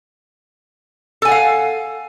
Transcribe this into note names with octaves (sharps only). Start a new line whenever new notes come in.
A4 F5 F#5 G#5